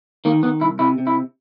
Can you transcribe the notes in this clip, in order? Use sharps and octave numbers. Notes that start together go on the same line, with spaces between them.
D#3 A#3
D#3 B3
C2 E4
C3 E4
C3
E4